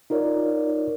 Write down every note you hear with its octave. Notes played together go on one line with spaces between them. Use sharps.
D#4 F4 A#4 C#5 D5